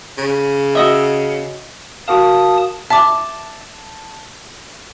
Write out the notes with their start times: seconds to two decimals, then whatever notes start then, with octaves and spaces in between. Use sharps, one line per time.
0.18 C#3
0.75 F#4 D#5 E5
2.08 F#4 A#4 F5 A5 D#6
2.90 E5 A5 D6